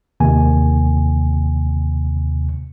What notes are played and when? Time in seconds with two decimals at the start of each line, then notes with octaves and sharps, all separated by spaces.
0.20 D#2 C3 G#5